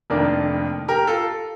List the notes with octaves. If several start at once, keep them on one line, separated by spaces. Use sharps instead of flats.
F1 F2 D#3 A#3 D4 A#4 D5
G4 A#4
F4 A4